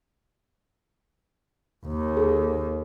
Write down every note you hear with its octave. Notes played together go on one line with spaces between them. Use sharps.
D#2
G#4 A4